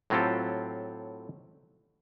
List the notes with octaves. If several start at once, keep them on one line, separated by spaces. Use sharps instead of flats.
A2 F#3 C4 F4 G4 A4